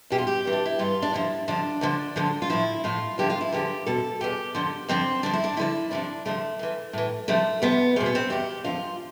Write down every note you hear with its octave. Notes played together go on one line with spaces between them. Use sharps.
E2 B2 G4
F4
G4
G2 E3
D4
E4
G2 E3 F4
D4
F2 D3 F3 E4
F2 D3 F3 D4
D2 D3 F3
D2 D3 F3
F4
A2 F3 E4
A2 F3 F4
E2 D3 F3 G4
F4
E4
E2 D3 F3 G4
E2 B2 A4
E2 B2 G4
F2 D3 F3
F2 D3 F3 C4
D2 D3 F3 D4
E4
D4
D2 D3 F3 E4
D2 C3 F3 D4
D2 C3 F3 A3
A2 E3
A2 E3
D2 C3 F3 A3
D2 C3 F3 B3
E2 B2 C4
B3
C4
E2 B2 G4
E2 D3 F3 F4